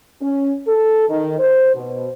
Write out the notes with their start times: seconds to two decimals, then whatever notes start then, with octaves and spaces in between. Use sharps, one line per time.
0.21 C#4
0.67 A4
1.09 D#3
1.39 C5
1.75 B2